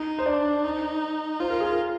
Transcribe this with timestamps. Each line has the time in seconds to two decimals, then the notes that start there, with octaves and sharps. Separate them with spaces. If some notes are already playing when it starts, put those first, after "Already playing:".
Already playing: D#4
0.19 C5
0.26 D4 D5
0.64 D#4
1.40 F4 C5
1.50 A#4
1.60 G#4
1.70 A#4